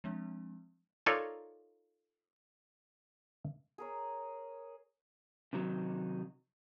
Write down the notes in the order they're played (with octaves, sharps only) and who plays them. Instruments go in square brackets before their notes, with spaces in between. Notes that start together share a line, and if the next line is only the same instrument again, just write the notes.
[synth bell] F3 G#3 C4 D4
[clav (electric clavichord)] D#4 F4 A4 A#4 C#5 D5
[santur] G#4 A#4 C#5
[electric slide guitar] C3 D#3 F#3 D#4